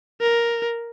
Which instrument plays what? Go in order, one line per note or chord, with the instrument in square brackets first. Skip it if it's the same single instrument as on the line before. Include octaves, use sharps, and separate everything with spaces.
[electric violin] A#4